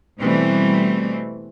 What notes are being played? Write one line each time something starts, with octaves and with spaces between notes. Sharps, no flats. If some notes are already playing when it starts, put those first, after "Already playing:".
B2 E3 G3 A3 C4